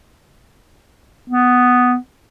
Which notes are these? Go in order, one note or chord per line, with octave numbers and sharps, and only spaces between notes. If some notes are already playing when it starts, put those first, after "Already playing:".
B3